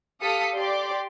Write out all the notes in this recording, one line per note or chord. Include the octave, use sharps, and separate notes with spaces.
G4 A4 F5 D#6 B6 C#7
G4 D5 C6 D6